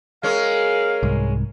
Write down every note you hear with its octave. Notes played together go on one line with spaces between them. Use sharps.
G#3 C#4 A#4 F5
C2 G#2